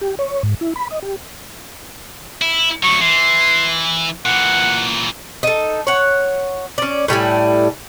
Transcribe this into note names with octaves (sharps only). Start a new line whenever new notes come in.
G4
C#5
G#2
E4
B5
D#5
G4
E4
D2 F#3 C#6
E3 C6
A#2 E3 F#5
D#4 A4
C#5 F#5
C#4 D5
A2 G3 E4 G#5